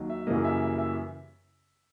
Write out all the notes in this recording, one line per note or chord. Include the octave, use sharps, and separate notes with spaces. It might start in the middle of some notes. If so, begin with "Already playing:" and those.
Already playing: D#2 D#3 F#3
E5
F#2 C#3 E3 G3 A#3 D#5
E5
E5
E5